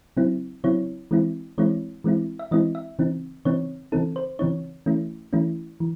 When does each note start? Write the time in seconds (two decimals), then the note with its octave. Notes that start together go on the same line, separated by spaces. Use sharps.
0.17 C#3 F#3 C4 E4
0.64 C#3 F#3 C4 E4 C#5
1.11 E3 G#3 C4 E4
1.58 E3 G#3 C4 E4 C#5
2.04 E3 G#3 C4 E4
2.39 E5
2.51 E3 G#3 C4 E4 D#5
2.75 E5
2.99 C#3 E3 C4 D#4
3.45 C#3 E3 C4 D#4 C#5
3.92 C#3 E3 C4 D#4 A4
4.16 C5
4.39 C#3 E3 C4 D#4 C#5
4.86 E3 A3 C#4 E4
5.33 E3 A3 C#4 E4
5.80 E3